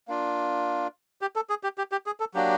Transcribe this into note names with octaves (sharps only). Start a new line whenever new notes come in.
A#3 D4 F4
G4
A4
G#4
G4
G4
G4
G#4
A4
F#3 A#3 D4 F#4 G4